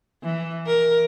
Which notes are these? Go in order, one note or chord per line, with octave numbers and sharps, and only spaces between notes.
E3
A#4